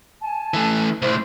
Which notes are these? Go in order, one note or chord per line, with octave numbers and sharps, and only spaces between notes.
G#5 A5
E3 A3
C2 A2 C5